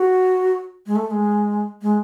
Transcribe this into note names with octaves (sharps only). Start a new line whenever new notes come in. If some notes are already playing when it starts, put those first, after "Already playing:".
Already playing: F#4
G#3
A3
A3
G#3
G#3